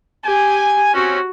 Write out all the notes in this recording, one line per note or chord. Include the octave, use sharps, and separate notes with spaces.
G4 G#5
C4 C#4 F#4